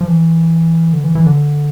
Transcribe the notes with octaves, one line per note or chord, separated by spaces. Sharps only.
F3
E3
D3
E3
E3
D3